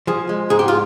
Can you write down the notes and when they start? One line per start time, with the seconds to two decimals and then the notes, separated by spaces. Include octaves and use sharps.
0.07 F3 G#4
0.29 G#3
0.50 G#2 G#4
0.59 G4
0.68 F4